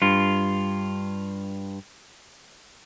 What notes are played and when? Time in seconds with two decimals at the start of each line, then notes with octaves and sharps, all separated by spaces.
0.02 G2 F4